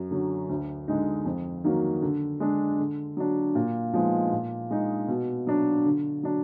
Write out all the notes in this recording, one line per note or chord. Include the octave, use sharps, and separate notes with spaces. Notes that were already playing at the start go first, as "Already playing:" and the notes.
Already playing: F#2
D3 F#3
D2
D3 G#3 D#4
F2
D#3 F#3 A#3
D3
G#3 D4
D3
F#3 D4
A#2
F3 G#3 B3 D#4
A#2
G#3 D#4
B2
F#3 D4
D3
F#3 D4